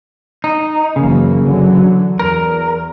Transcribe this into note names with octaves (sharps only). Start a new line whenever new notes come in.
D#4
F#1 C#3 E3 A#3
D3 E3 F#3
E2 A#4